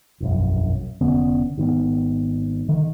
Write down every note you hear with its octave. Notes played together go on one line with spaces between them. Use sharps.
E1 A#1 F#2
F1 D3 B3 C#4
G#1 D#3 B3
D3 D#3